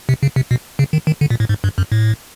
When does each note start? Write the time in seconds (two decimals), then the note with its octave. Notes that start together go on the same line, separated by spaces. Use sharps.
0.09 C3
0.23 C#3
0.36 C3
0.51 B2
0.79 C#3
0.93 D#3
1.07 D#3
1.21 D3
1.30 A#2
1.40 A2
1.49 G#2
1.64 G2
1.78 F#2
1.92 A2